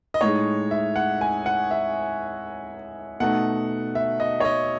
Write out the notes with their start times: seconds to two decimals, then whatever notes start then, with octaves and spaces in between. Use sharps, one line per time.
0.14 D#5
0.21 A2 G#3 D#4 C#5
0.71 E5
0.96 F#5
1.21 G#5
1.46 F#5
1.71 E5
3.20 B2 A3 D#4 F#5
3.95 E5
4.20 D#5
4.40 C#5
4.45 D#5